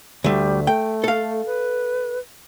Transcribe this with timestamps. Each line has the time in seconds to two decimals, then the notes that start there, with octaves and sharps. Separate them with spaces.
0.24 D2 G3 A3
0.67 A3 G5
1.04 A4 F5
1.46 B4